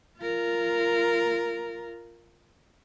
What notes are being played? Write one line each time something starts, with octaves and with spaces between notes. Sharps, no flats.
F4 A#4